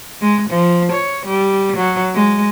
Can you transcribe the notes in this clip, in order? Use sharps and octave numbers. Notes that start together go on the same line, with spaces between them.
G#3
F3
C#5
G3
F#3
G#3